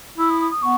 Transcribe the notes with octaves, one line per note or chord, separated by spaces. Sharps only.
E4 E6
D#6
D#6
D#6
B3 C#6